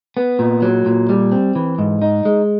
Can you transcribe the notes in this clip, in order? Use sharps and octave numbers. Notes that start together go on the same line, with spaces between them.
B3
A#2
F#3
A#2
G3
C4
E3
G#2
D#4
G#3